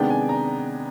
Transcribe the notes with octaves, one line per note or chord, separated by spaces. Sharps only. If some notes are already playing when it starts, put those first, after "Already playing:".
Already playing: C3 D#3 G#3 B3 D4 G5
G#5
A#5